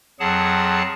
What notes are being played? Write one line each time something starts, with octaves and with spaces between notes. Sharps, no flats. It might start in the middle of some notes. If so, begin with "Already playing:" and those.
F2 F#3 G#4 F#5 A5